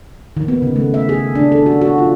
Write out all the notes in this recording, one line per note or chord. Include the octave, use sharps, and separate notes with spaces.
D#3
B3
C#3
A3
E5
G#4
D4
A4
F#4
F#4
F4